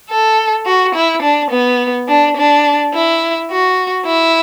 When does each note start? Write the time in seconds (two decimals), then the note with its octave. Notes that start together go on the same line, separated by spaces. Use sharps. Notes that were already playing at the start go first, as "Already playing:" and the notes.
0.10 A4
0.66 F#4
0.95 E4
1.22 D4
1.51 B3
2.08 D4
2.37 D4
2.94 E4
3.51 F#4
4.06 E4